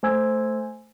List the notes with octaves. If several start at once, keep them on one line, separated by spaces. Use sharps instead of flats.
A3 C5 G#5 E6 G#6